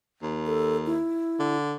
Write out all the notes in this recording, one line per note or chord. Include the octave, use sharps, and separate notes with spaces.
D#2
A4
E4
D3